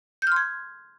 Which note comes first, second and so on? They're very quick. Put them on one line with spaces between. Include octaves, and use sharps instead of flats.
G6 F6 C6 G#6